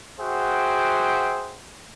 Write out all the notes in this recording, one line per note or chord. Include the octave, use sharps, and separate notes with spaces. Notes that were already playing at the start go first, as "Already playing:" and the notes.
F#4 G#4 C5 E5 F#5 G5